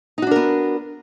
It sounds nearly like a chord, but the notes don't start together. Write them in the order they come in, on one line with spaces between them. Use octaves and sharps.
D#4 F#4 D4 A#4 B3